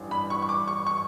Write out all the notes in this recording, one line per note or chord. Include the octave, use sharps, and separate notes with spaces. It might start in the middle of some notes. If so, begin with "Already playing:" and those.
Already playing: A1 G2
B5
C#6
C#6
D6
C#6
C#6